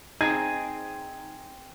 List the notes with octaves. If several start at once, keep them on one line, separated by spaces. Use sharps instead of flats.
C4 D#4 G#4 G#6